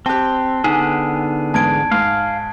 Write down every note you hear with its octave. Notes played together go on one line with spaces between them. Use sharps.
C4 G4 G5 A5 F#6
D3 B3 D#4 G#4
E2 G#2 A5 G#6 D7
G#2 F5